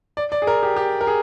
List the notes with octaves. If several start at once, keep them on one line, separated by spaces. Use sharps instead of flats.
D5
D5
G#4
A#4
G4
G4
A#4
G#4